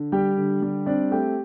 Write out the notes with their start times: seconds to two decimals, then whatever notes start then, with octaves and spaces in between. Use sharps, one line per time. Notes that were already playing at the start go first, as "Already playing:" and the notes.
Already playing: D3
0.12 G3 G4 G5
0.37 D3
0.62 G3
0.86 C4 D4 D5
1.11 A3 G4 G5